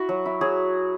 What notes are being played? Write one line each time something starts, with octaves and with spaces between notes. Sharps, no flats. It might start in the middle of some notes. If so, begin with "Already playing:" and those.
Already playing: E4 F#4
F#3
E4
F#3 G#4